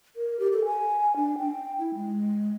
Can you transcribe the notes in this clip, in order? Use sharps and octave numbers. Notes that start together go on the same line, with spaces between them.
A#4
G4
A4
G#5
D4
G5
E4
G#3